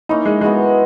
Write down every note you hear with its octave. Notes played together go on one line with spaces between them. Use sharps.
A#3 C#4 D#4 E4
G#3
G#3 B3 F#4 A#4